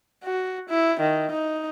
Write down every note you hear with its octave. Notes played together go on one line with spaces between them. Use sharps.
F#4
E4
D#3
D#4